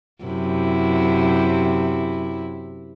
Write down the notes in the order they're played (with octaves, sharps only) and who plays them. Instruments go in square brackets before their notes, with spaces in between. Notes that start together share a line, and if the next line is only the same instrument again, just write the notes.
[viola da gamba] F#2 C3 E4